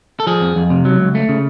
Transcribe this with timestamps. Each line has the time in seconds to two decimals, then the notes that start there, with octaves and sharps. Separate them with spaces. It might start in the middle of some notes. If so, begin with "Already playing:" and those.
0.20 A4
0.27 F3 G#4
0.41 F2
0.56 F2
0.70 C3
0.85 F#3
0.99 C#2
1.15 A3
1.29 C#3